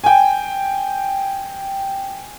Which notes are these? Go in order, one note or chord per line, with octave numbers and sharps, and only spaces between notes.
G5 G#5